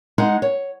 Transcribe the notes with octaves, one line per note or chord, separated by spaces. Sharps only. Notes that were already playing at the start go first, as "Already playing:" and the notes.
G#3 D#4 F#5
C#5